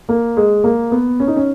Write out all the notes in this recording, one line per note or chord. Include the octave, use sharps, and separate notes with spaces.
A#3
G#3
A#3
B3
C#4
D#4
C#4